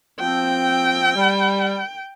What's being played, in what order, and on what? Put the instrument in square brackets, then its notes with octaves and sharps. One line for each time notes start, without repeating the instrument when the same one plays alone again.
[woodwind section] F3 C4 [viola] G5
[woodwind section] G3